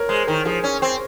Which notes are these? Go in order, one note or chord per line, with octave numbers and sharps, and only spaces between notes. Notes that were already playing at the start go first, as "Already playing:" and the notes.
Already playing: A#4 C#5
G#3 C5
D#3 A#4
F3 G#4
C#4
C4